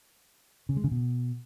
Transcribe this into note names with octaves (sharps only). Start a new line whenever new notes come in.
C#3
G#3
C#3
B2